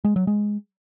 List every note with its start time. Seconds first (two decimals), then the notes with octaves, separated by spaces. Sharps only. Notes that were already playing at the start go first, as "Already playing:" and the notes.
0.05 G#3
0.16 F#3
0.27 G#3